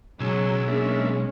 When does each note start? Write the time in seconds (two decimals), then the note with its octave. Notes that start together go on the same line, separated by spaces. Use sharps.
0.20 B1 C#3 F#3 G#3 G#5 E6
0.68 G#3 A#3 C#4 D4 E5